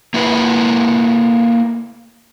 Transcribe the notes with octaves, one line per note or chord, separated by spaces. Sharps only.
A#3 E4 B4